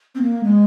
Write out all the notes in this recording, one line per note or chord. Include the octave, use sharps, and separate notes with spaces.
C4
A#3
G#3